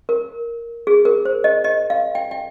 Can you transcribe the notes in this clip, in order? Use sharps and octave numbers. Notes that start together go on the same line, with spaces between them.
A#4
G#4
A#4
C5
D#5
D#5
F5
G5
G5